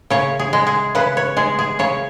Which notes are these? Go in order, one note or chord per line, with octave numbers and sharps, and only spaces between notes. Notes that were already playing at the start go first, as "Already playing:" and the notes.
C#3 C#5
G#4
G#3
G#4
C#3 B4
C#5
G#3 G#4
G#4
C#3 C#5